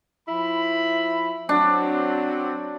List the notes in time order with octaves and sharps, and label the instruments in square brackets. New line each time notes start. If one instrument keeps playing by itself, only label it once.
[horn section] F3 E4 B5
[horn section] F#3 C4 [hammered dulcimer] D4